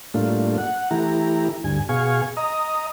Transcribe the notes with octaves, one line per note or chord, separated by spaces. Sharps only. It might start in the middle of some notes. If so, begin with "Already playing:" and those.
A2 G3 A3 A#3 D4 F4
F#5
E3 A3 E4 G4 A#5
D2 G2 G#5
B2 G#4 F5 G#5 C#6
D#5 A#5 D#6